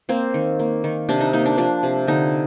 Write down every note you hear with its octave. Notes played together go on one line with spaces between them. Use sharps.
A#3 C4
D#3
A#3
D#3
C3 D4
D#4
A#3 D#4
D4
F3 D4
C3
D3 D#4